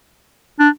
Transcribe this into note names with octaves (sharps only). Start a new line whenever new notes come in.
D4